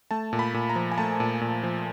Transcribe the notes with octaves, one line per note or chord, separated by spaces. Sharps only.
A3 A5
A#2
B5
A#2
A#5
F3
G#5
A3 A5
A#2
A#2
F3